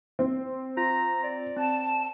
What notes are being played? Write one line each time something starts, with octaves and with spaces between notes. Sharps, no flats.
C4
F4 A#5 A#6
D5
C4 A5